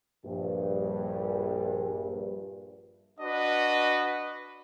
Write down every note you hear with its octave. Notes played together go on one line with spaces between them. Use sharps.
A#1 G2
D4 F#4 B4 D#5